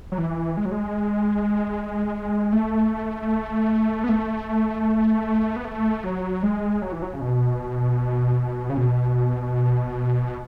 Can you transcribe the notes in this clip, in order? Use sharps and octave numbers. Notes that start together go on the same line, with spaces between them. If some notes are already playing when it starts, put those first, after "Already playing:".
F#3
E3
G#3
F#3
G#3
A3
B3
A3
B3
A3
F#3
G#3
F#3
E3
F#3
C#3
B2
C#3
B2